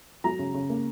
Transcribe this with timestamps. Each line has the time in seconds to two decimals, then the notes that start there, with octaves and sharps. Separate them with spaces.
0.24 F#3 A#5
0.39 C#3
0.54 C#3
0.70 A#3